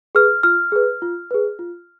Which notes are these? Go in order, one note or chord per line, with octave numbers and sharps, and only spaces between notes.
G#4 B4 F6
F4 F6
G#4 B4
F4
G#4 B4
F4